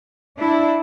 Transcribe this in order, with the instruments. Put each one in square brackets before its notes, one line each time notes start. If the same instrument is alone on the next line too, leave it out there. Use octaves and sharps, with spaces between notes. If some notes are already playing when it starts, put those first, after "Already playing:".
[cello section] D4 E4